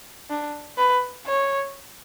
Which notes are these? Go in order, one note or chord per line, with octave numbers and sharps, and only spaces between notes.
D4
B4
C#5